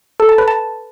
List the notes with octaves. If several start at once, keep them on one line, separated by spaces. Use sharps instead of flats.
A4
A5
B4
A5